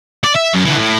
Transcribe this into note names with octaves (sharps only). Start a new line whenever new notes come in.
D5
E5
F#2
D3 E3
A2